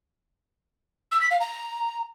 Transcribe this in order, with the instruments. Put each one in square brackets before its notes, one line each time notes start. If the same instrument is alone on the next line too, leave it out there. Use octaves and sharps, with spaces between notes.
[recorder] E6
B6
F5
A#5